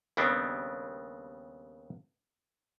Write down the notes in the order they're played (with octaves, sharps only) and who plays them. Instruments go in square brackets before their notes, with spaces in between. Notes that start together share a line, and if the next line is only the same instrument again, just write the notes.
[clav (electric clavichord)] D#2 C#3 G3 B3 C4 D4